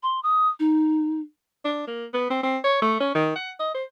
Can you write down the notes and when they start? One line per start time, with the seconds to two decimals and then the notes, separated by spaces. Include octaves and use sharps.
0.03 C6
0.23 D#6
0.60 D#4
1.65 D4
1.87 A#3
2.14 B3
2.30 C4
2.43 C4
2.64 C#5
2.82 A3
3.00 C#4
3.15 D#3
3.36 F#5
3.60 D#5
3.75 C5